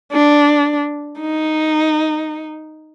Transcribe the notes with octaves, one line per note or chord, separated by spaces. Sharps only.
D4
D#4